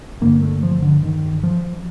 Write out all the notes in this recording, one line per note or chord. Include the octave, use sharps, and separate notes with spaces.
G2 D3 A#3
A3
F3
D3
D#3
F3